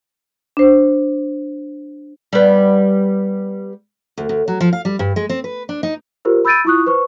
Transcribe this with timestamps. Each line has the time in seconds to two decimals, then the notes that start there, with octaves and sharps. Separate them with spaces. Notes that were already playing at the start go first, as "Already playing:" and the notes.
0.57 D4 C5
2.33 G3 B3
4.17 D2
4.29 D2
4.48 F#3
4.60 F3
4.73 F5
4.85 G3
4.99 G2
5.16 G#3
5.29 C4
5.44 B4
5.69 D4
5.83 D#4
6.25 F4 G4 A#4 C5
6.45 B5 E6 G6 A6 D7 D#7
6.65 E4 F4 C#6 D#6 F#6
6.86 B4 C5 C#6